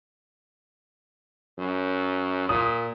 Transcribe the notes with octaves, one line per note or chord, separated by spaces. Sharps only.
F#2
A#2 D#6